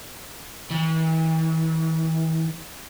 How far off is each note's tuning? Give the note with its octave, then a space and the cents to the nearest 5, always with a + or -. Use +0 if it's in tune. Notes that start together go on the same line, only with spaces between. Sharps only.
E3 -40